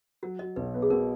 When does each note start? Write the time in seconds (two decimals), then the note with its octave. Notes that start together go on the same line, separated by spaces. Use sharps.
0.23 F#3 F#4
0.39 F#3 D#5
0.56 B1 B4
0.74 B3
0.82 G#4
0.90 B2 A#4